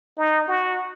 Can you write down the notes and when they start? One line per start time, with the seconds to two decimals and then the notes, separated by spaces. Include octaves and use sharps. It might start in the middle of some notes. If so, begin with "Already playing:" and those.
0.17 D#4
0.48 F#4